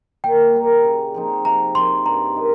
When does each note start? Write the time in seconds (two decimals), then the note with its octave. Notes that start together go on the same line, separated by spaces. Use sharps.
0.24 A#2 G5
0.54 G3 A#3
0.84 C#3
1.14 F3 C4 D#4
1.45 C3 A#5
1.75 F3 C4 C6
2.06 G2 A#5
2.36 D#3 G#3 D#4